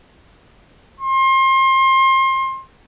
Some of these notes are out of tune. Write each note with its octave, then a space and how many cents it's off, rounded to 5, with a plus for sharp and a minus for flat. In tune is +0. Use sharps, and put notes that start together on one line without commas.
C6 +30